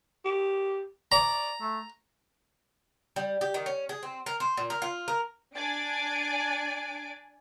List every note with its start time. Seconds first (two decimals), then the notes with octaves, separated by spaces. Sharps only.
0.25 G4
1.12 D5 A#5
1.60 A3
3.16 G3
3.41 G4
3.54 D#3
3.66 C#4
3.89 G#4
4.03 C4
4.26 A#4
4.40 C5
4.57 A#2
4.70 A#4
4.82 F4
5.08 A#4
5.55 D4 D5 G#5 D7